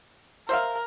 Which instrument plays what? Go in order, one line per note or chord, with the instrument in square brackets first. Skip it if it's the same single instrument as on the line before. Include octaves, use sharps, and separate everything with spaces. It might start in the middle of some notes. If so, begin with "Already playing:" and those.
[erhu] A#4 [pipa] C5 E5 F5